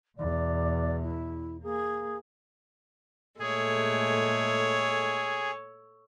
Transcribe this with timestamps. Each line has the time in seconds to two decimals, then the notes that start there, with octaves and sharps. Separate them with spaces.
0.18 E2 B2 D5
1.03 E4
1.63 A#3 G#4
3.40 A#2 G#3 A3 G#4 A4 C#5